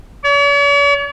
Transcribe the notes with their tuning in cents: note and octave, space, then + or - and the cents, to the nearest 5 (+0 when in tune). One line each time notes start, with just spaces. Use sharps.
C#5 +45